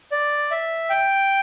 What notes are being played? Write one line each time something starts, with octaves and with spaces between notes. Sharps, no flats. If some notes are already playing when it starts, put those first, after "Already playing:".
D5
E5
G5